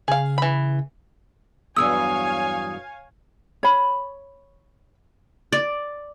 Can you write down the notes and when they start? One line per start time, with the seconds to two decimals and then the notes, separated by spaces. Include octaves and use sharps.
0.08 C#3 G#4 F5
0.38 E3 B5
1.77 E2 G2 F#3 C#5 F5 G#5 D#6 E6
3.63 C#5 B5
5.52 D5